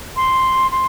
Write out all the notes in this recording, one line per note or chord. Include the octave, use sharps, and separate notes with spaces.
C6
C6